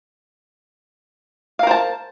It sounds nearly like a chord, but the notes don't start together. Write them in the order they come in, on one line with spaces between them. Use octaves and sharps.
F5 A#4 C5 A5